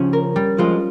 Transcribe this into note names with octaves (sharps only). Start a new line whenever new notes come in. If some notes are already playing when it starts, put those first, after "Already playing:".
Already playing: C#3 F3 C#4 G4
A#4
G3
F3 G#3 F4